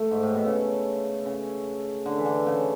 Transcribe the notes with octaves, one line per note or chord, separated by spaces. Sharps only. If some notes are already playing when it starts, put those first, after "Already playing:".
Already playing: A3
G#2
A2
B2
C#3
C#3
D3
E3
D3
C#3